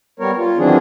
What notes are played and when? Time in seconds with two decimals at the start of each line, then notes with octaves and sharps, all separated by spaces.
0.20 G3 B3 A#4 C#5
0.38 F4
0.58 D#3 E3 F#3 C4 D4 G#4